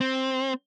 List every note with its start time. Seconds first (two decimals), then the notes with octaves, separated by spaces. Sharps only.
0.01 C4